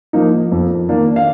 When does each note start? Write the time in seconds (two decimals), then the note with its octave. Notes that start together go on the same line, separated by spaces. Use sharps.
0.13 F3 A#3 D#4
0.52 F2
0.89 D#3 A#3 D4
1.16 F5